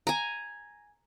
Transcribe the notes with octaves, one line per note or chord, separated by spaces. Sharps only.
G#5 A#5